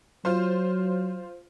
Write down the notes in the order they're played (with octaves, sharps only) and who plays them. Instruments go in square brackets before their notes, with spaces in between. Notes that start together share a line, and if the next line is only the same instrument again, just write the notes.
[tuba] F#3 [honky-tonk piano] F4 C5